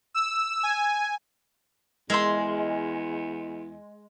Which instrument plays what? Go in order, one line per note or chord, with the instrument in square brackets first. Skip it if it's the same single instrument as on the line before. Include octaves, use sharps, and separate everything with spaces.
[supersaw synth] E6
G#5
[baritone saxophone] E2 [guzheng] G#3 [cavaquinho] A#4 E5 C6